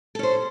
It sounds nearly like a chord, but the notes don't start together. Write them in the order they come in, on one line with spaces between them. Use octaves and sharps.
A4 C#4 C5